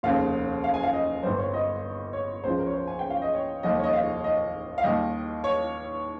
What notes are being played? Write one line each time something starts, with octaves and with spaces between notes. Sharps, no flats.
F1 D#2 C#3 F5
F5
G#5
F5
D#5
G1 G2 G3 C5
C#5
D#5
C#5
C#2 C#3 F3 C5
A#4
C#5
C5
G#5
G5
F5
D#5
C#5
F1 D#2 D#3 G3 D#5
C#5
D#5
F5
D#5
F5
D#2 D#3 G3 D#5
C#5